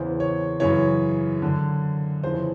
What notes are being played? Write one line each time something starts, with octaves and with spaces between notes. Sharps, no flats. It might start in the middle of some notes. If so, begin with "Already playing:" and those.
Already playing: E2 C#3 E3 C5
C#5
F#2 C#3 E3 C#5
F#2 D3
F2 C#3 E3 C5